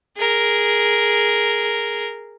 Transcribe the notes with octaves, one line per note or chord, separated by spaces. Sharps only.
G#4 A#4